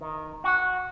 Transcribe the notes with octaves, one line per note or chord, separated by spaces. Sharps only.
D#3
F#4